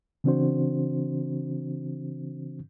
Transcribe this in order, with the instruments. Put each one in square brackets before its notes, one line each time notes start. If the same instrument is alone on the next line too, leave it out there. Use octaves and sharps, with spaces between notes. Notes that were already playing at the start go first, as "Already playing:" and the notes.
[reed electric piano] C#3 E3 C4 D4 F#4 C5